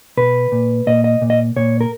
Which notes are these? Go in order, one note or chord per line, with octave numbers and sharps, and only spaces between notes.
B2 B4
A#2
A#2 D#5
D#5
A#2
D#5
A#2 C#5
A#4